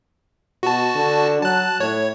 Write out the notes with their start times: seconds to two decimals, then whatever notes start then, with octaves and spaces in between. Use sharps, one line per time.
0.63 B2 F#4 A5
0.95 D3
1.42 F#3 A5 F#6
1.80 A2 C#5